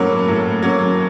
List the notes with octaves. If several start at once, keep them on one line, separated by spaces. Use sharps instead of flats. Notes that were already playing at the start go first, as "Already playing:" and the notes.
Already playing: A2 F#3 A#3 C#4
A2
F#3 A#3 C#4